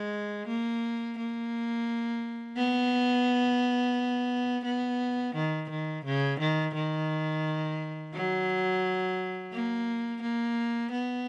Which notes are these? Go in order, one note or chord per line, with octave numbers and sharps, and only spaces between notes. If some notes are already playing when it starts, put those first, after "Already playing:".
Already playing: G#3
A#3
A#3
B3
B3
D#3
D#3
C#3
D#3
D#3
F#3
A#3
A#3
B3